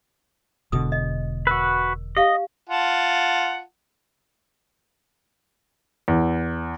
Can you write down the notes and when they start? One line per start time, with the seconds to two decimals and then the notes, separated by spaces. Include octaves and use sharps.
0.72 E1 B2 D3 D#6
0.92 D#5
1.47 F#4 A#4 B4
2.17 G4 D#5 F5
2.69 F4 F#5 A5
6.08 E2